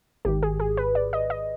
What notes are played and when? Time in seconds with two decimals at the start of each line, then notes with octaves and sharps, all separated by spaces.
0.25 G#1 G#2 D#3 G4
0.43 G#4
0.60 G#4
0.77 B4
0.95 D5
1.13 D#5
1.30 D#5